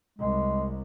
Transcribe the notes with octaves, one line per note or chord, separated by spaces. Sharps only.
C2 G#3